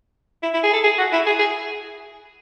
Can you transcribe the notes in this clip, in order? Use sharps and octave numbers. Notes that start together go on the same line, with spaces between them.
E4
E4
G#4
A4
G#4
F#4
E4
G#4
G#4